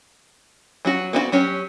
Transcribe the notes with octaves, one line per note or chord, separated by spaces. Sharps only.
F#3 C#4 F#4
B3 C4 E4 F#4
F#3 C#4 G4